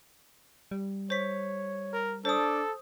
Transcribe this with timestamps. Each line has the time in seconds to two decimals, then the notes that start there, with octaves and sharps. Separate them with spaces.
0.71 G3
1.10 C5 C#5 B6
1.93 A#4
2.25 D4 A4 C5 D#6